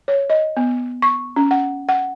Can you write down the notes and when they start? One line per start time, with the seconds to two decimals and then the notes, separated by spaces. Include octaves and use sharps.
0.08 C#5
0.30 D#5
0.57 B3
1.02 C#6
1.36 C#4
1.51 F#5
1.89 F#5